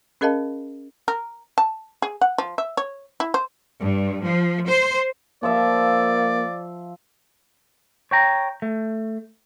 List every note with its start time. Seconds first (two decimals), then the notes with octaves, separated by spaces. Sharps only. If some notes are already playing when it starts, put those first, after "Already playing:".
0.21 C#4 G#4 A#4 D#5 F5 A5
1.08 A#4
1.58 A5
2.02 G#4
2.21 F#5
2.38 F3
2.58 E5
2.77 C#5
3.20 E4
3.34 C5
3.80 G2
4.24 F3
4.67 C5
5.43 F3 A#3 D5 E5
8.11 C#5 G5 A#5
8.62 A3